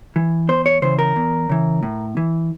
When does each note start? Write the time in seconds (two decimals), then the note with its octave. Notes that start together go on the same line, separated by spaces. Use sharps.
0.16 E3
0.49 E2 C5
0.66 C#5
0.82 C#3 E3 C5
0.99 A#4
1.16 E2
1.49 C#3 E3
1.83 A2
2.17 E3